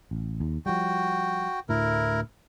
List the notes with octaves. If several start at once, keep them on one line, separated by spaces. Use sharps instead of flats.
A1
D#2
F3 G3 F#4 G5
D2 A2 E4 A#4